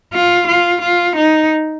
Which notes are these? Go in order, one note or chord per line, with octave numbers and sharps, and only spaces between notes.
F4
F4
F4
D#4